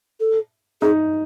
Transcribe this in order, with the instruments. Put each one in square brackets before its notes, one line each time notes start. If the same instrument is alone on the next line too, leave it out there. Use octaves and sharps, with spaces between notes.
[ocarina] A4
[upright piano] D#4 [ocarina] G#4